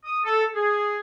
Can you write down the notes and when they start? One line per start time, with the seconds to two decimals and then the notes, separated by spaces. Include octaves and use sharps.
0.04 D#6
0.25 A4
0.55 G#4